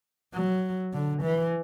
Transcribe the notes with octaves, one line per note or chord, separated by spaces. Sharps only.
F#3
D3
E3